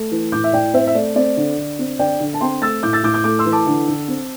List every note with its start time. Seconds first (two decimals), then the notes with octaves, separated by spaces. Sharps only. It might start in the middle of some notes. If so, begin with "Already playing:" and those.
Already playing: A3
0.11 E3
0.32 A2 D6 G6
0.44 E5
0.53 A2 D5 G5
0.74 C4 C5 E5
0.87 E5
0.95 A3 D5
1.16 C4 D5
1.37 D3
1.57 D3
1.79 C4
1.99 D3 D5 G5
2.20 D3
2.34 A5
2.41 C4 G5 C6
2.62 A3 E6 A6
2.83 A2 D6 G6
2.93 E6 A6
3.03 A2 D6 G6
3.14 D6 G6
3.24 A3 D6 G6
3.39 C6 E6
3.45 E3
3.52 A5 D6
3.67 D3
3.88 D3
4.08 C4